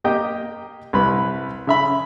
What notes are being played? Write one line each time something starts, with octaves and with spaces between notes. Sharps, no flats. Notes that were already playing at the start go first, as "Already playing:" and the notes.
A#3 G4 D#5 G5
C2 B4 B5
C#3 E5 B5